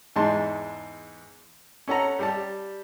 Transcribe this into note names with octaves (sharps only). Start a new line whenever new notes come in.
E2 G#2 G#3 A5 C6
C#4 A4 F#5 A#5
G3 G4 A5